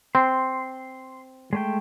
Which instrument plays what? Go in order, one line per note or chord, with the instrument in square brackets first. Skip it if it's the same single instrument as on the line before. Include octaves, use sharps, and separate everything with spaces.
[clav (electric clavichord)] C4 [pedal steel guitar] C6
[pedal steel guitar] G#3 A3 G5